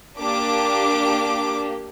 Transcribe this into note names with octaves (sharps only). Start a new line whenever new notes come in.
A#3 D4 G4 D6